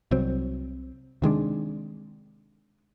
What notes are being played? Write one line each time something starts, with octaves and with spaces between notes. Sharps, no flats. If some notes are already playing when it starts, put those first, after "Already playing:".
C2 F#3 C4
C3 D#3 G#3 D4